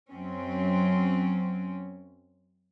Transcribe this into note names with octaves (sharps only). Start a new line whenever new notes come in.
F#2 F#3 C4 C#4